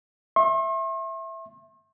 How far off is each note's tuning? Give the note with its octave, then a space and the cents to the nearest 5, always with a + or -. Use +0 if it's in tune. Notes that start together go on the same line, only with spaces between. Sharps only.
E5 +0 C6 +45